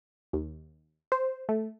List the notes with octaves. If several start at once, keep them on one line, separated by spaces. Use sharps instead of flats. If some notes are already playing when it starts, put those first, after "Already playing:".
D#2
C5
A3